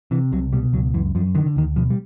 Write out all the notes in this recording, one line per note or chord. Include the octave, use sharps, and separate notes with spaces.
C3 E3
C2 F#3
B2 G3
C#2 F#3
F#2 E3
F#2 F3
D3 D#3
D3
D2 D#3
B2 F3
G3